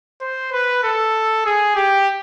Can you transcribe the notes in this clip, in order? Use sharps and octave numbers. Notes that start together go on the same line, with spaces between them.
C5
B4
A4
G#4
G4